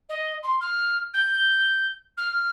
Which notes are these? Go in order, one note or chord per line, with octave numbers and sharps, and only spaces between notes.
D#5
C6
F6
G6
F6